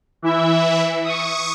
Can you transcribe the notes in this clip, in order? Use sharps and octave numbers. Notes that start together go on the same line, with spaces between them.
E3 E4 E5
C#6 D#6